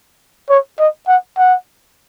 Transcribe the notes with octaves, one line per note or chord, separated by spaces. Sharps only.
C#5
D#5
F#5
F#5